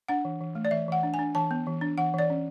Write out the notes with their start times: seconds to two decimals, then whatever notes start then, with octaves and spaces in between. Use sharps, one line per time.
0.08 D4 F#5
0.25 E3
0.41 E3
0.55 A3
0.65 D5
0.71 E3 E5
0.88 E3 F#5
1.03 D4
1.14 G#5
1.19 D4
1.35 E3 A5
1.51 B3
1.67 E3
1.81 D4
1.98 E3 F#5
2.14 E3 D5
2.30 C#4